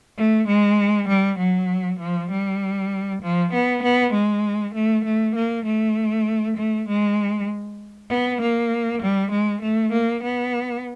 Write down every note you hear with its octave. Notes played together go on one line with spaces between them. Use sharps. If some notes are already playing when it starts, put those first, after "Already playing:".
A3
G#3
G3
F#3
F3
G3
F3
B3
B3
G#3
A3
A3
A#3
A3
A3
G#3
B3
A#3
G3
G#3
A3
A#3
B3